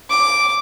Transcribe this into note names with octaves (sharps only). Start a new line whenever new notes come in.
D6